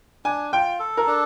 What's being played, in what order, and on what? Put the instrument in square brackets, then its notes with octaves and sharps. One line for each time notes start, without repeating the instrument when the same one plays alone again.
[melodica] D4 [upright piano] G#5
[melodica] F4 [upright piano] G5
[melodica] A4
[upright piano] A#4
[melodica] D4